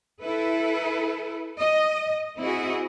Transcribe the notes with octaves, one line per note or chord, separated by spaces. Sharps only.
E4 A4 B4
D#5
C4 E4 F#4 G#4 D#5